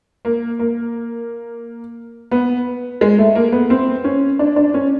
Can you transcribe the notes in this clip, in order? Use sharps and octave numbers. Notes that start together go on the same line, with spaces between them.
A#3
A#3
B3
G#3
A3
A#3
B3
C4
C#4
D4
D4
C#4